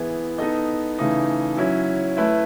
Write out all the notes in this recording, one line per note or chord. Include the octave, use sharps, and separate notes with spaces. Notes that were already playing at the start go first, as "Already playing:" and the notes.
Already playing: E3 B3 E4 G#4
B3 D#4 A4 D#5
C#3 E3 A3 D#4
F#3 C#4 E4
A3 E4 B4 E5